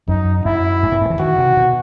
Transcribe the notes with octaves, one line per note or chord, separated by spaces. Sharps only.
F#2 D#4
F#2 E4
G2
A2
G2
E3
D#3 F#4
C3
B2